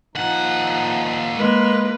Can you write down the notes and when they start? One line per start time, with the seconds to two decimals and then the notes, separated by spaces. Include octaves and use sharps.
0.15 D#2 F3 D#4 F#5
1.37 G#3 A#3 B4